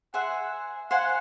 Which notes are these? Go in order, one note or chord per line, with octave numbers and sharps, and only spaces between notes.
G#4 C5 E5 F#5
C5 F5 F#5 G#5